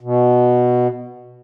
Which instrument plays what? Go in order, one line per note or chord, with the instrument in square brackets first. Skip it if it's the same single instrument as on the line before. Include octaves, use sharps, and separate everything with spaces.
[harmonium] B2